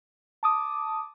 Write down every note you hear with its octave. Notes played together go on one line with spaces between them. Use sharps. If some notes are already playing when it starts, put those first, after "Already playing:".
A5 D6 D#6